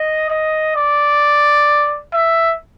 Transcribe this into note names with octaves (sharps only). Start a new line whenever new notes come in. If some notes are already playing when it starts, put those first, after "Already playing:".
Already playing: D#5
D#5
D5
E5